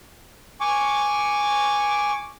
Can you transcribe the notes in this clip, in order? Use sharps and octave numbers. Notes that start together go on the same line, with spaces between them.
G#5 C#6 D6